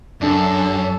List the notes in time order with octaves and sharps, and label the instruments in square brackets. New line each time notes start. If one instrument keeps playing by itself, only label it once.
[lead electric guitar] F#2 [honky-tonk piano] D4 [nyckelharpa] A4